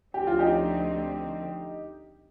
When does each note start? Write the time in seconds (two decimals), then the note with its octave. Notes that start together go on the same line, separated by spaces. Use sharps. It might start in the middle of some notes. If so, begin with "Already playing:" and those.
0.14 D2 D3 F3 A3 C4 G4
0.27 F4
0.39 D#4 G4